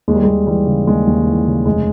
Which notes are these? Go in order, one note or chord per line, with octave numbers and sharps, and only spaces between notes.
D#2 G#3
G3
G#3
D#2
E3 G3
C#3
D#2 G#3
D#2
E3
C#3
F1 G#3